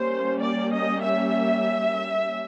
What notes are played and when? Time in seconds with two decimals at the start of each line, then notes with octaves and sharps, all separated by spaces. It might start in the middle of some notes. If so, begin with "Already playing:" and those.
Already playing: G3 A#3 C#4 C5
0.40 D5
0.73 D#5
1.05 E5